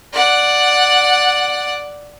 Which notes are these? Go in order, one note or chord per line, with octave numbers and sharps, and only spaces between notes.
D5 F#5